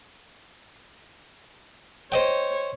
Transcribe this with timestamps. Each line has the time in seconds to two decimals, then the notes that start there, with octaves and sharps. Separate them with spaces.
2.12 C5 C#5 D#5 G5